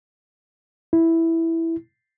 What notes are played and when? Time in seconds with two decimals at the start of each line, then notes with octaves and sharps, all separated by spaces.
0.93 E4